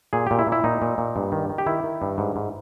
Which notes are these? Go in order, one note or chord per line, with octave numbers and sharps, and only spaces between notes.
A#2 G#4
A#2 G4
E4
A#2
E4
A#2 D#4
A#2
A#2
G2
D#3
D#3
G4
D#3 E4
D#3
G2
G#2
G#2